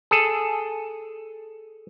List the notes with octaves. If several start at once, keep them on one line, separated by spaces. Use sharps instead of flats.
G#4 A4